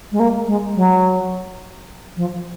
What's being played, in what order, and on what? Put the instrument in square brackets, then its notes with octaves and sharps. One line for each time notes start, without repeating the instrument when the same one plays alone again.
[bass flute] G#3
A#3
G#3
F#3
F3